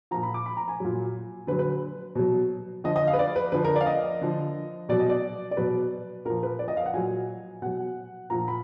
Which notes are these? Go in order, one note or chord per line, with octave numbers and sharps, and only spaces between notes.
A#2 F3 A#5
B5
D6
B5
A#5
G#5
A#2 F#3
D3 F#3 B4
B4
B2 F#3
D3 F3 D#5
D#5
F5
B4
D5
B4
D3 F3 B4
A#4
D5
F5
D#5
D3 F3
B2 F#3 D5
D#5
D5
D5
B2 F#3 B4
A#2 F3 A#4
B4
D5
D#5
F5
F#5
A#2 F#3 G#5
B2 F#3 F#5
A#2 F3 A#5
B5